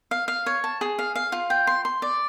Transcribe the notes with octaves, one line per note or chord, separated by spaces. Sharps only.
F5
F5
C#5
A5
G#4
F5
F5
F4
G5
C6
C6
D5